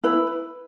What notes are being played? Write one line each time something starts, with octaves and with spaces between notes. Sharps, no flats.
E4 B4